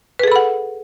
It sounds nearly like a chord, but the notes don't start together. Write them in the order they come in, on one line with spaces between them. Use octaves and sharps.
B4 G#4 A4 B5 F#5